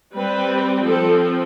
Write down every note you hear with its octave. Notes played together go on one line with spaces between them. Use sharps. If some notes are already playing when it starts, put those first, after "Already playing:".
G3 C4 B4
F3 C4 A4